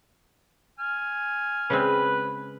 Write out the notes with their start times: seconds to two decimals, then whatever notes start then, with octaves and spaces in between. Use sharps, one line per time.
0.79 G#5 F6
1.70 C#3 G#3 C4 B4